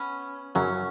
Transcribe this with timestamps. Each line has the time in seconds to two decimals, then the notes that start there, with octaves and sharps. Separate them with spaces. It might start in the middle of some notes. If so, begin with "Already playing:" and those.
Already playing: B3 C#4
0.55 F#2 C#3 F#3 C#4